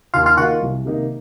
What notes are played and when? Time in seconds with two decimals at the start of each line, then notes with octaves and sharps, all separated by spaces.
0.14 D#2 F4 F5
0.26 F4 F5
0.37 D#3 A#3 F4 F#4 F#5
0.61 C2
0.85 C3 D#3 A#3 D#4